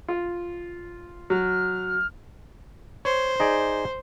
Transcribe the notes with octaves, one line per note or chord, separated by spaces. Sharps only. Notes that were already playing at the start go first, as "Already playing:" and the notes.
F4
F#3 F6
C5 C#5
D#4 G#4 D5